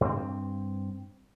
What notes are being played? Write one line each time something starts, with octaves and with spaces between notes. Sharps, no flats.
G2 C4